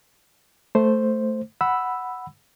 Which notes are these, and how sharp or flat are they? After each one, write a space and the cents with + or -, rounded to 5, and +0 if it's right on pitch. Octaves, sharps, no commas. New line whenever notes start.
A3 +0 C5 +0
F#5 +0 B5 +0 E6 +0